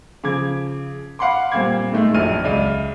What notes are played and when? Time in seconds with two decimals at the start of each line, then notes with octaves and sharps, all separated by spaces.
0.24 C#3 F3 D6 G#6
1.19 F5 F#5 B5 C6 D6
1.52 A#2 G3 C4 F5 D6 G#6
1.92 A2 D#3 G#3 A3
2.14 A#1 F2 F#3 F6 D#7
2.44 C#2 D5 E5 F6 D#7